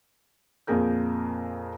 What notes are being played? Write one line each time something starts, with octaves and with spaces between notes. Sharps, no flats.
F2 A#2 A#3 G#4 A#4 G6